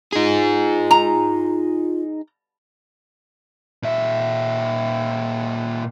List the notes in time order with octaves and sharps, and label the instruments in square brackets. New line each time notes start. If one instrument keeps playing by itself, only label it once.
[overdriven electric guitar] D#4 G#4 [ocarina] F4
[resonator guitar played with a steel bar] A#5
[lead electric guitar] A#2 E5